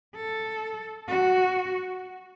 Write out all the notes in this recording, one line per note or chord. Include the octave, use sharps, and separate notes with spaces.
A4
F#4